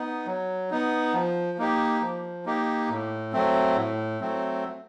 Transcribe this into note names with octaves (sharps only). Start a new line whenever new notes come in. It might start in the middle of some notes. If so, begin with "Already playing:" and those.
Already playing: B3 D#4
F#3
B3 D#4
F3
A#3 D#4 G4
F3
A#3 D#4 G4
A2
F#3 A3 C4
A2
F#3 A3 C4